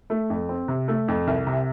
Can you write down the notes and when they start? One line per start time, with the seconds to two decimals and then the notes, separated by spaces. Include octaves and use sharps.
0.10 A3
0.30 F2
0.49 C4
0.68 C3
0.88 A3
1.08 F2
1.27 C2
1.47 C3